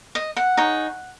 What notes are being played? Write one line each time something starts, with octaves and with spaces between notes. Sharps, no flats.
D#5
F#5
D#4 G#4 C#5